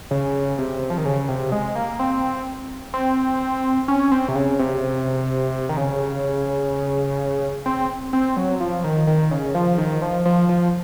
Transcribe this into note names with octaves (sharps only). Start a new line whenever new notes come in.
C#3
C3
F3
D#3
C#3
C3
G#3
A#3
C4
C4
C#4
C4
C3
C#3
C3
D#3
C#3
C4
C4
F#3
F3
D#3
D#3
C#3
F3
D#3
F3
F3
F3